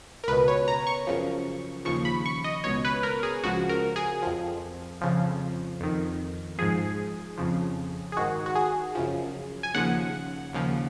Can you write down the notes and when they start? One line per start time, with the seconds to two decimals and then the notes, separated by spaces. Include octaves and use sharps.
0.24 A#4
0.28 C#2 B2 B4
0.48 C#5
0.68 A#5
0.87 C#6
1.07 F#2 C#3 F3
1.85 D#2 C#3 F3 C#6
2.05 B5
2.26 C#6
2.44 D#5
2.64 C#2 B2 C#5
2.85 B4
3.03 A#4
3.23 G#4
3.44 C#2 C#3 F3 F#4
3.69 A#4
3.96 G#4
4.23 F2 F3
5.01 F2 C#3 F3
5.80 F2 D#3
6.58 G#2 F3 G#4
7.37 F2 C#3 F3
8.12 G#4
8.17 G#2 D#3 F#4
8.46 F#4
8.55 G#4
8.95 F#2 C#3 F3
9.63 G#5
9.74 D#2 C#3 F3 F#5
10.53 D#2 C#3 F3